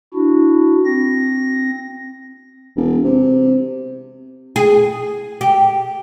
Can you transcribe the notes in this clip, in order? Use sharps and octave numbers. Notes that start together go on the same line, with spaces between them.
D4 E4 F#4
C4 A#6
E1
C3
G#4
G4